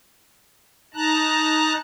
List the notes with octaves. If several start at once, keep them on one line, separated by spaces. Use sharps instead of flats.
D#4 A5 A#5 F#6